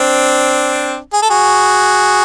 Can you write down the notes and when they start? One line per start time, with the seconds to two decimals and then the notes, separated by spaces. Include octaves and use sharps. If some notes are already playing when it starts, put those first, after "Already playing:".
Already playing: C4 D4
1.13 G#4
1.22 A4
1.30 F#4 G#4